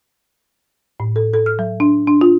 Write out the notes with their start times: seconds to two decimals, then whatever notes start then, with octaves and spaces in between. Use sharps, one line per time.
1.00 A2
1.16 A4
1.34 A4
1.46 F6
1.59 F#3
1.80 D4
2.07 D4
2.21 F4